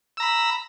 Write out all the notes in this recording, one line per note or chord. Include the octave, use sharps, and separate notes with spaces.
A#5 B5 E6